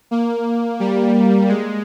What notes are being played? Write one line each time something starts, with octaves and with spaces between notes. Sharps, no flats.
A#3
G3
G#3